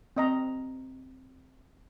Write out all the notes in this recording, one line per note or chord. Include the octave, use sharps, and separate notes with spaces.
C4 D#5 A#5